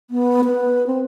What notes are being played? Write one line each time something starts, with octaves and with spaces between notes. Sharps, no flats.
B3
B4
C4